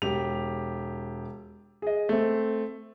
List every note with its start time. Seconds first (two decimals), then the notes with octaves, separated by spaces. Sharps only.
0.02 E1 G4 F7
1.82 G#4 D#5
2.09 A3 C4